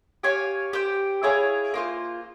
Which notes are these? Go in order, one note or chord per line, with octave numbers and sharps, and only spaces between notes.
G4 C#5 F5 G#5
G4 C5 G5
E4 G#4 C#5 F5
A#3 F4 C5